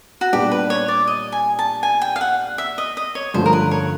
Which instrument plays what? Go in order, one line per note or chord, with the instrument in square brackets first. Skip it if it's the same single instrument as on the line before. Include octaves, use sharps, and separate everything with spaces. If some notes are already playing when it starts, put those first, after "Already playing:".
[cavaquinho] F#4
[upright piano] A#2 G3 B3 D4 [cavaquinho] G4
[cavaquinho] B4
C#5
D5
D#5
G#5
A5
G#5
G5
F5
F#5
E5
D#5
D#5
C#5
[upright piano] G2 D3 F3 A3 C#4 [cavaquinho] C5
[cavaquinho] A#4
B4
C#5